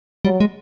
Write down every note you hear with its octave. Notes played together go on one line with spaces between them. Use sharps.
F#3 G3
G#3